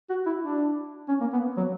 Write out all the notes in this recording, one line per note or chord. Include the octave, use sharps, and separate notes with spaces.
F#4
E4
D4
C#4
A#3
B3
F#3